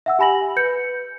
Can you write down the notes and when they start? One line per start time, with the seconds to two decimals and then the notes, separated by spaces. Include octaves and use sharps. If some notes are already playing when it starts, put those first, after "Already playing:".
0.06 E5 F#5 E6
0.19 G4 G#5 B5 A#6 F#7
0.56 B4 G6 C#7